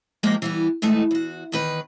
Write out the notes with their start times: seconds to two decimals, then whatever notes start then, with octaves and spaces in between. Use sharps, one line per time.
0.23 F3 G#3 A#3 G4 A#4
0.42 E3 G3 B3
0.82 G#2 E3 A3 D#4
1.11 E2 F#4
1.52 E2 D#3 B4